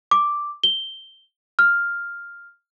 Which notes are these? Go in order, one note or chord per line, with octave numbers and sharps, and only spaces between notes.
D6
G7
F6